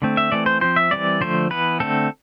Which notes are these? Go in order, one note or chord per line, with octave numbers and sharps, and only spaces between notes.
D3 A3 C4
E5
E3 A3 C4 D5
C5
F3 C4 C5
E5
E3 G3 C4 D5
D3 F3 A3 C5
E3 B3 B4
D3 A3 C4 A4